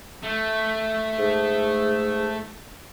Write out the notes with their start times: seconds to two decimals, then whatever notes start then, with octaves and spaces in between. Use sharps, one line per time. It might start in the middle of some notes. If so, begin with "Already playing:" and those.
0.23 A3
1.18 G#2